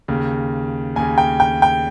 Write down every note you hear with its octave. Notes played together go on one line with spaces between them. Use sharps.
D#2 C#3
D#2 C#3 G#5
G5
G5
G5